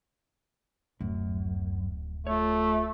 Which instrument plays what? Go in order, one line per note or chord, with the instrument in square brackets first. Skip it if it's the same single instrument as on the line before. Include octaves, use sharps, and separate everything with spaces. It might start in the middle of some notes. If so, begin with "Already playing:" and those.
[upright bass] D1 [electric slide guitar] F#2
[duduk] A3 [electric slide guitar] F4 A4 C#5